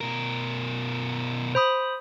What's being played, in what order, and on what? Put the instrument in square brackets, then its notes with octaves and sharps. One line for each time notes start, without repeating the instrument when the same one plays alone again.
[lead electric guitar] B2 A#4
[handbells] C5 B5 D#6